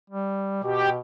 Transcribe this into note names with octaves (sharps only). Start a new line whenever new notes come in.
G3
B2 G4